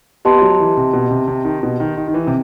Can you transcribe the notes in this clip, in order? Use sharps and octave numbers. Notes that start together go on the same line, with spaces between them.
B3 G4 D#5 A5 C6
F#3
E3
C3
B2
C3
C3
D#3
B2
D#3
D#3
D#3
E3
C3